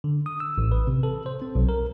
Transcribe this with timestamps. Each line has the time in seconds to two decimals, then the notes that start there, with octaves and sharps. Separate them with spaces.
0.04 D3
0.26 D#6
0.40 E6
0.58 A1
0.72 B4
0.87 C3
1.03 A4
1.26 C5
1.42 C4
1.55 B1
1.69 A#4